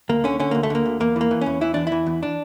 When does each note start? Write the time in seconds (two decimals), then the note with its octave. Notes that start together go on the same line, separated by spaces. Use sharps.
0.09 D2 A#3
0.24 D3 C#4
0.40 D3 C#4
0.51 D2 A#3
0.63 A3
0.70 D3 A#3
0.86 D2
1.00 E2 A#3
1.16 E3 A#3
1.31 E3
1.41 E2 C#4
1.61 E3 E4
1.74 E2 D4
1.87 E4
1.92 E3
2.07 E2
2.23 D4